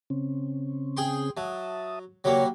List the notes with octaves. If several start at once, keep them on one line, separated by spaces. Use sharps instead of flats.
C#3 C4 C#4
G#4 G5 C6
F#3 E5 A5 D#6
C#3 F#3 G3 A#3 C#5